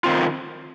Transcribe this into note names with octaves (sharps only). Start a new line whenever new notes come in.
D#3 C4 F4